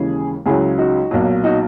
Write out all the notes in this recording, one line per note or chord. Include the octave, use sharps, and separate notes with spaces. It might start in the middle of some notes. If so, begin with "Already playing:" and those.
Already playing: D#2 C#3 E3 G#3 E4 G#4
C#2 C#3 F#3 E4 G#4
D#4 F#4
B1 A#2 F#3
D#4 F#4